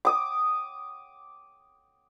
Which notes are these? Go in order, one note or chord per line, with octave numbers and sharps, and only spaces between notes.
D6 D#6